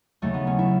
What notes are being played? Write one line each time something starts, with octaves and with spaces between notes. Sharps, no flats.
D#2 C#3 F#3 A3
B3
C#4
E4